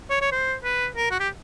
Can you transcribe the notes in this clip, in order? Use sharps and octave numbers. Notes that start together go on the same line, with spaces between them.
C#5
C#5
C5
B4
A#4
F#4
G4